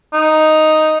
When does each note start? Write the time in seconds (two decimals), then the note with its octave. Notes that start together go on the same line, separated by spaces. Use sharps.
0.14 D#4